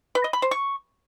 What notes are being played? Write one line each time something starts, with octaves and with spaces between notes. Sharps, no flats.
B4
D#5
B5
C5
C#6